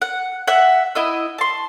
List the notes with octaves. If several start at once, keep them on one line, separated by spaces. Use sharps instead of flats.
F#5
E5 F#5
E4 D#5 E6
A5 C6